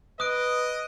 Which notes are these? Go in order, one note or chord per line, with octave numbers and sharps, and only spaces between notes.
B4 D#5 D#6 F#6 D7